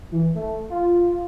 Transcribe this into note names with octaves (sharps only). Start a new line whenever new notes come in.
E3
A3
F4